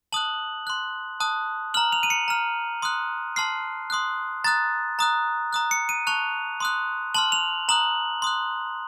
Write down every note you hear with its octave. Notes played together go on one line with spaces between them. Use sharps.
A5 D#6 F#6 F#7
C6 F#6
A5 D#6 F#6
A#5 F6 F#7
F7
D#7
C#7
A#5 F6
C6 D#6 F#6
A5 C6 F6 C7
C6 D#6 F#6
A#5 D#6 F#6 A6
A#5 D#6 F#6
A#5 D#6 F#6
C#7
D#7
A5 C#6 F#6 F7
C6 D#6 F#6
A5 C6 F6 F#7
F7
A#5 D#6 F#6 F#7
C6 D#6 F#6